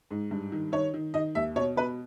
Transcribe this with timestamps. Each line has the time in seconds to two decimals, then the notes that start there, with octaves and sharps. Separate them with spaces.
0.11 G#2
0.31 G2
0.52 D#3
0.72 D#3 C#5
0.94 D#3
1.14 D#3 D#5
1.35 D#2 E5
1.56 B2 C#5
1.76 B2 B4